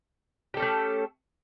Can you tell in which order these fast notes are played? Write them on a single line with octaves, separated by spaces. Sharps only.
G4 A4 C#4 A3